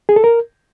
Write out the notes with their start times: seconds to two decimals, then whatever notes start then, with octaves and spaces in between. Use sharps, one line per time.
0.09 G#4
0.16 A4
0.24 A#4